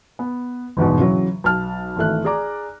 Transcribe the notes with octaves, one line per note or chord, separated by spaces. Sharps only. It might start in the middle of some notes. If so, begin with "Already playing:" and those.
B3
G1 E2 G#2 B2
C#3 E3 F#3
B1 A5 F6
G#1 E3 A3 F#6
G#4 D5 A#5 D6